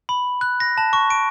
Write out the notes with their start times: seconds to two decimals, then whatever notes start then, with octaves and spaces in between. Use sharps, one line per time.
0.09 B5
0.41 F#6
0.60 A#6
0.78 A5
0.93 C#6
1.10 D7